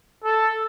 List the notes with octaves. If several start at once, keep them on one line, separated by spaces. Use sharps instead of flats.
A4